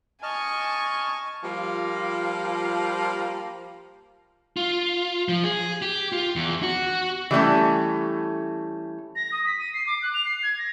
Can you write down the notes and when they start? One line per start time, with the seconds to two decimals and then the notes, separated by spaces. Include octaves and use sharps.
0.23 D#5 G#5 A5 C#6 F6
1.44 F3 G3 A#3 F4
4.57 F4
5.28 F3
5.44 G#4
5.82 G4
6.12 F4
6.36 E2
6.63 F#4
7.31 E3 G3 A3 C#4
9.16 A#6
9.32 D#6
9.46 B6
9.59 D#7
9.74 C7
9.87 D6
10.02 F#6
10.14 F7
10.25 C7
10.43 G#6
10.58 A#6